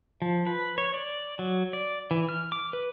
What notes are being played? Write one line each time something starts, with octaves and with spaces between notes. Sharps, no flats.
F3
B4
C#5
D5
F#3
D5
E3
F6
D6
B4